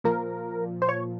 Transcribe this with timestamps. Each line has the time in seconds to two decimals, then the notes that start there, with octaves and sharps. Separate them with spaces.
0.04 A#2 F3 A#4
0.82 C5
0.89 C#5